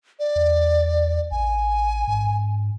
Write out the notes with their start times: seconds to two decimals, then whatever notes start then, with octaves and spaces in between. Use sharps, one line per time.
0.19 D5
0.36 E2
1.31 A1 G#5
2.08 G#2